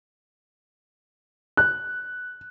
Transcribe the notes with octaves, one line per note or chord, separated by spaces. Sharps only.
F#6